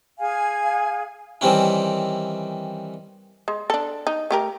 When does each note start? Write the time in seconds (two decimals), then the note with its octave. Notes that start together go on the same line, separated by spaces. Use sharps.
0.18 G#4 F5 G#5
1.41 D#3 E3 G3 C4 C#4 E4
3.48 G#3
3.70 D4 A4
4.07 D#4
4.31 A3 G4 A#4